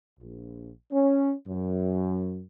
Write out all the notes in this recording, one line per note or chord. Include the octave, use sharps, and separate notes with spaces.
A#1
C#4
F#2